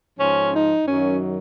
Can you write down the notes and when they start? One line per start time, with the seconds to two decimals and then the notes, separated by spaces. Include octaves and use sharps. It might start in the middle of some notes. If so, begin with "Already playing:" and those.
0.19 G#2 F3 C#4
0.53 D#4
0.86 F#2 D#3 F#3 C#4